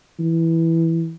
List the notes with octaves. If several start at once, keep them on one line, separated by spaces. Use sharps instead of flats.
E3